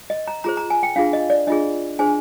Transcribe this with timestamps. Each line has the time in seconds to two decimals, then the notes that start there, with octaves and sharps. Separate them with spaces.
0.10 D#5
0.28 A#5
0.44 F4 G#4 C5 A#5
0.57 A#5
0.70 G#5
0.83 G5
0.96 D4 F4 G#4 F5
1.13 D#5
1.30 D5
1.47 D4 F4 G#4 D#5
1.99 D4 G#4 C5 G#5